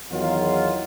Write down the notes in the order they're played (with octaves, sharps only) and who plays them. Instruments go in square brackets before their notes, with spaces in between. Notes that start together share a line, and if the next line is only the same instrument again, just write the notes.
[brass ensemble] E2 D#3 F#3 F4